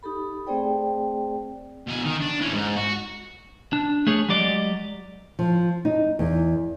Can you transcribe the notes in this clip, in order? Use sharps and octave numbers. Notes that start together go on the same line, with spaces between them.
D#4 G4 A4 B5
A3 C4 G#4 C5 D5 G5
B2 G#5
D#3
D4
E3 C#4
G#2
F#4
D4
A3 G#4 C#5
F#3 G#3 G4 D5 D#5
F3
D#4
E2